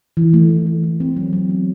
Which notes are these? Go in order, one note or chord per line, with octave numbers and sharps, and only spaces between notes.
E3
A3
E3
A3
E3
C4
F#3
F#3
B3